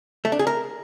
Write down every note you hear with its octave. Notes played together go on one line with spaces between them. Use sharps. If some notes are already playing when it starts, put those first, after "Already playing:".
A3
D4
G#4
A#4